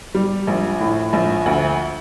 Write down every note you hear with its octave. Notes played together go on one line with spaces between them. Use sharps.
G3
A#1
A2
A#1
D2